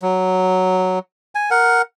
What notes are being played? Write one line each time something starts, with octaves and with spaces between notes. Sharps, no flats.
F#3
G#5
A#4 F#5